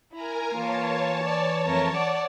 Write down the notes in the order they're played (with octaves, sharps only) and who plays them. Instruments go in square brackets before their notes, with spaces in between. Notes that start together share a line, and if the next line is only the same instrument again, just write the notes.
[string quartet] E4 [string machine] A#4 G#5 A#5
[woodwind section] E3 [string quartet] A#3 F4 [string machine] C#5 A5
[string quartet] D5
F2 A3 A#4
D5 F#5 D6